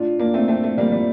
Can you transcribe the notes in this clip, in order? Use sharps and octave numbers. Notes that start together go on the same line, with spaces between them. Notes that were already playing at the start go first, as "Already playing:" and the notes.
Already playing: A2 D4 F4
A#3 D4
A3 C4
A3 C4
A3
G3 A#3
G3